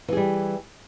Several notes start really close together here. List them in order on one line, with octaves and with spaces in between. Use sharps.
E3 G#4 G3